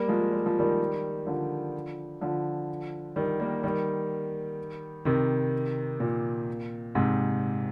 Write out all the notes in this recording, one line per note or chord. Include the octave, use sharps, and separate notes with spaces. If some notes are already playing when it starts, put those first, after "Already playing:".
Already playing: G3 A#3
F3 G#3
G3
F3
D#3 G3
D3 F3
D3 F3
D#3 G3
G3 A#3
D#3 G3
C3 D#3
A#2
G#2 C3